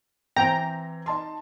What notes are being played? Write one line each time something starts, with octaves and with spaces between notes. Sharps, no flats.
E3 C4 G5 A#5
D#4 A5 C6